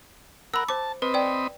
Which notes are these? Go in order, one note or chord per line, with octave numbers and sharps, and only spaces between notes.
A#4 F#5 B5 E6
C5 A5 D6
C4 B4 D#5 B5
D5 G5